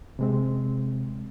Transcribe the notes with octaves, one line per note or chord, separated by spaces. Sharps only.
C3 G#3 C4